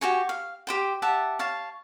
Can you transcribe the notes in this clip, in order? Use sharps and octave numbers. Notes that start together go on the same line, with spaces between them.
F#4 G4 G#5 C#6
F5
G4 C5 G5
G4 E5 F#5 A5
C#5 F5 A5